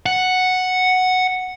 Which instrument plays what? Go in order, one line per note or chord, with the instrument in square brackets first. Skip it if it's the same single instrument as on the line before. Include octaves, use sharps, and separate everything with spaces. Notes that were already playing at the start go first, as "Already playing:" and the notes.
[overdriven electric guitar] F#5